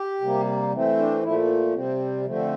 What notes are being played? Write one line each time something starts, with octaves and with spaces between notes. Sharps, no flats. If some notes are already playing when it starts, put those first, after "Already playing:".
Already playing: G4
C3 G3 A#3
E3 A3 C4
D4
A#2 F3 A3 E4
C3 G3 C4
D3 F3 A3 C4